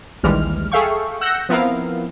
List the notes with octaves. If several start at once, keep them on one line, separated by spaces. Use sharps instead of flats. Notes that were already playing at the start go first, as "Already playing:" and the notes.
A#1 D#2 E3 G3 G#3 F6
G#4 A4 E5 F5 G5 C#6
F#5 E6 F#6 G6 A#6 C#7
F3 B3 C4 E4 A#4 F5